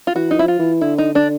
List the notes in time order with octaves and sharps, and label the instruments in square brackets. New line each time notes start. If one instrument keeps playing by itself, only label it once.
[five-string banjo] F4
[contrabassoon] E3 [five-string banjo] F#4
[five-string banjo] D#4
[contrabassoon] F3 [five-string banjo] E4
[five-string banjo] F4
[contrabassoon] E3
[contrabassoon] D3 [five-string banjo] E4
[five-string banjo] D#4
[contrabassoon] D3 [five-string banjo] D4